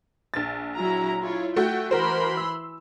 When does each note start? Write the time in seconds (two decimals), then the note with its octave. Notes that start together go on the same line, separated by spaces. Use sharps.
0.34 A#1 A6
0.76 F#3 E4 A#5
1.20 E4 F4 C#5
1.56 A3 F#4 G5
1.91 E3 F#4 A#4 C5 B5 C6
2.37 E6